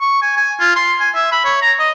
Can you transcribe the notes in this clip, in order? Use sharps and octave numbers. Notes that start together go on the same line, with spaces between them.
C#6
G#5
G#5
F4
C6
G#5
E5
B5
C#5
A#5
D#5